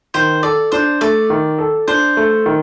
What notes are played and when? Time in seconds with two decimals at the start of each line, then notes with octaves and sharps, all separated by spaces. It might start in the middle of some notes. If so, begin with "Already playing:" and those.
0.14 D#3 C5
0.43 A4 D5
0.72 D4 C5
1.01 A3 D5
1.30 D#3
1.59 A4
1.88 D4 C5
2.17 A3
2.46 D#3